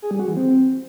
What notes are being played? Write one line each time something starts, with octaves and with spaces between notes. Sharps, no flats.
G#4
G3
F#4
E3
C4